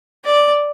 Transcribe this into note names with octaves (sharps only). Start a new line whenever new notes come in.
D5